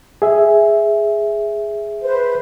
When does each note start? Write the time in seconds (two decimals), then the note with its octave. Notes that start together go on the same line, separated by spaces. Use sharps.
0.22 G#4 E5
2.03 B4 C5